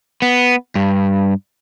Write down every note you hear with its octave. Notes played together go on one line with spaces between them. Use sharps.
B3
G2